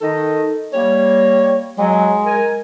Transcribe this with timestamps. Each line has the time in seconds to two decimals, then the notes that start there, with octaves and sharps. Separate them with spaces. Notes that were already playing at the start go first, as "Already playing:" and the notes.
0.01 D#3 D#4 A4 D#5
0.73 G3 A#3 C#5
1.78 F#3 G#3
2.26 A#4 G#5